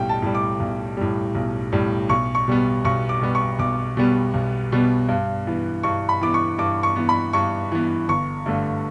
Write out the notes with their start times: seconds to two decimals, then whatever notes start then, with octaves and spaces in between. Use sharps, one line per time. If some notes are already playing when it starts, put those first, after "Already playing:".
Already playing: B1 A2 G3 G5
0.09 A5
0.22 A2 G3
0.35 D6
0.60 B1
0.97 A2 G3
1.35 B1
1.72 A2 G3
2.09 B1 C#6
2.35 C#6
2.48 B2 G3 B3
2.85 B1 C#6
3.09 D6
3.21 B2 G3 B3
3.35 C#6
3.59 B1 D6
3.97 B2 G3 B3
4.34 B1
4.72 B2 G3 B3
5.09 G2
5.47 E3 B3
5.83 G2 C#6
6.09 B5
6.21 E3 B3 D6
6.34 C#6
6.58 G2 D6
6.83 C#6
6.96 E3 B3
7.09 B5
7.33 G2 C#6
7.72 E3 B3
8.09 G1 C#6
8.46 G2 D3 A3